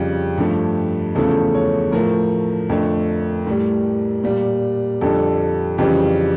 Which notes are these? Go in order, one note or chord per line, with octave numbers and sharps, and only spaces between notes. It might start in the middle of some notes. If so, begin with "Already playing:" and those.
Already playing: F2 C#3 G3
G2 F3 A3
E2 C#3 F3 A3 A4
C#5
A2 F3 A3 A#4
F2 D3 A3
A2 G3
A#2 G3
F2 D3 G3 A4
F2 C#3 E3 G3 G4